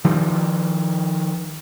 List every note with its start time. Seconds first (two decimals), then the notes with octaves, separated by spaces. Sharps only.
0.04 D#3 F3 G3